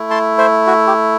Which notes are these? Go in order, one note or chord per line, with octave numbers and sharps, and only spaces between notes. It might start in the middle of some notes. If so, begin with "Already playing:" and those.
Already playing: A3 E4
A5 C6
C5 E5
F#4
G4